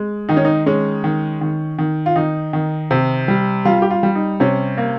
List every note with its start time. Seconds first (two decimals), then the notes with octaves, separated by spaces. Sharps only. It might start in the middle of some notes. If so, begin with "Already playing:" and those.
Already playing: G#3
0.29 D#3 D#4
0.37 C#4
0.45 D#4
0.66 G#3 C#4
1.04 D#3
1.41 D#3
1.78 D#3
2.06 F4
2.16 D#3 D#4
2.53 D#3
2.91 C3
3.28 G3
3.65 G3 F4
3.82 G4
3.90 F4
4.03 G3
4.15 D#4
4.40 C3 C#4
4.78 A#3